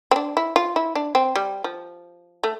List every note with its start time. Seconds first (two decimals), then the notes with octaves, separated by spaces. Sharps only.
0.11 C4
0.16 D4
0.37 E4
0.56 F4
0.76 E4
0.95 D4
1.15 C4
1.36 G3
1.64 F3
2.44 A3